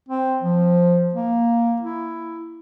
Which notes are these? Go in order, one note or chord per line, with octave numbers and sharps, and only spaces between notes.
C4
F3
A#3
E4